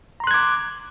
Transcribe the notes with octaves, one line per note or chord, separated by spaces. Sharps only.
A#5 C6 D6 F#6 G#6